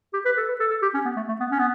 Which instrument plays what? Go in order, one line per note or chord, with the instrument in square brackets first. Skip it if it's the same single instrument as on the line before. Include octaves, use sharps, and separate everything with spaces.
[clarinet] G4
B4
A4
B4
A4
A4
G4
C#4
B3
A3
A3
B3
C#4
B3